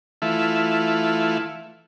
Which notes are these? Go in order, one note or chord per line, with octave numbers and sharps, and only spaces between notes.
E3 A3 E4 F4